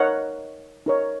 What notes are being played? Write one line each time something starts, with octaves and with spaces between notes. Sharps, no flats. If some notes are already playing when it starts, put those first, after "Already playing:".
Already playing: D#4 A#4 C#5 F#5
D#4 A#4 C#5